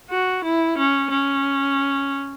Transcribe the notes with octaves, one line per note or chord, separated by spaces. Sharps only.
F#4
E4
C#4
C#4